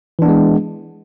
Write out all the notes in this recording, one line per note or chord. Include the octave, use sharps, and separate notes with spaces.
E3 G#3 B3 D4